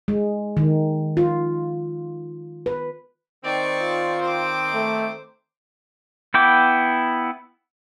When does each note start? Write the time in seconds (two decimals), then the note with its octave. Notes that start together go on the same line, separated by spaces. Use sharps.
0.08 G#3
0.57 D#3
1.17 F4
2.66 B4
3.44 D#3 C4 D5 C#6
3.82 F4
4.21 C5 D6
4.74 A3
6.34 B3 E4 G5 D6